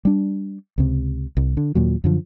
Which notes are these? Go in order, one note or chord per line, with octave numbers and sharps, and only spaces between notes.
G3 D4
C#2 C3
C2
D3
D#2 A#2 F#3
F#2 D3 F3